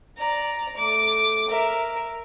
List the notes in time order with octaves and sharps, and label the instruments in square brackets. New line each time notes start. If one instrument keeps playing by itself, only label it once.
[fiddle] D5 A#5
A3 D6
A#4 E5